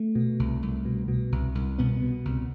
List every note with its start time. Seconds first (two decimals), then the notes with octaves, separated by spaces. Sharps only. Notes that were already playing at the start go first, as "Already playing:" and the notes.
Already playing: A3
0.15 B2
0.39 C2
0.63 C2
0.85 B2
1.08 B2
1.32 C2
1.55 C2
1.78 B2 B3
2.02 B2
2.25 C2